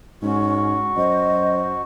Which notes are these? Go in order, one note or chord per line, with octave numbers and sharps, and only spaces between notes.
G#2 C#4 F#4
F#2 C5 D#5